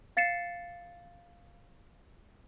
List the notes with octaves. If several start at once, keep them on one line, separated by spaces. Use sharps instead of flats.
F5 A6 C7 C#7 E7